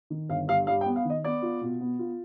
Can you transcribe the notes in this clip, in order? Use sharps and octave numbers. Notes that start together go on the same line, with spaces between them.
D#3
G1 F5
G2 F5
G3 F5
G5
B3
F5
D#3 D#5
B3 D5
F4
B2
B3
F4